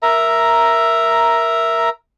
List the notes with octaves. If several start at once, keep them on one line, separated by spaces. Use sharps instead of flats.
A#4 E5 A#5